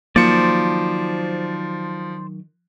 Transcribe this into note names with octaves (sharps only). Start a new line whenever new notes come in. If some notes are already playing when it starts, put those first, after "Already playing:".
D#3 F3 F#3 A#3 C5 D5 C#7